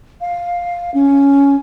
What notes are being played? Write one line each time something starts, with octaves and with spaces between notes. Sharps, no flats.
F5
C#4